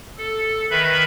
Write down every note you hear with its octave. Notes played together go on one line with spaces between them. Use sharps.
A4
D#3 B4 E5 B5